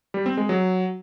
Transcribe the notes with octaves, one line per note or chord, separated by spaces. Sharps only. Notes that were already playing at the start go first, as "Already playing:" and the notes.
G3
C4
G#3
F#3